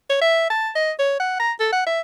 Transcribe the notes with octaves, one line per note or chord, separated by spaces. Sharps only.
C#5
E5
A5
D#5
C#5
F#5
A#5
A4
F#5
E5